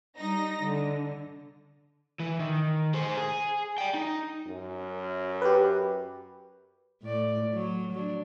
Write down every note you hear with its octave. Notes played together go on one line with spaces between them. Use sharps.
G3 D#4 A#6
D3
E3
D#3
G#4 C5
G#4
D5 G5
D#4
F#2
G4 B4
A2 D5
F#3
F#3 D4